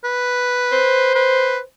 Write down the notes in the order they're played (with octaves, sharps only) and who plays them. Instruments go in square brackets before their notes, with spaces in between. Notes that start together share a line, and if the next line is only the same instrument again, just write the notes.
[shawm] B4
[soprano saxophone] C5
[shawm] B4